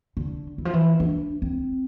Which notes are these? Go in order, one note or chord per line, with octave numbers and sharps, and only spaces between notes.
D3
E3
F3
E3
D4
C4